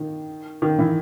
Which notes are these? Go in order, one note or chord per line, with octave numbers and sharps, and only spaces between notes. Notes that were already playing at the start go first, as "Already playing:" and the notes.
Already playing: D#3
D#3
E3